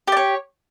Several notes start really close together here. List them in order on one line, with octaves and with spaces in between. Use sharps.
G4 D5 C#5